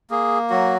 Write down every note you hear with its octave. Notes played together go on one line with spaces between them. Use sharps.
A#3 G#4
F#3 F#4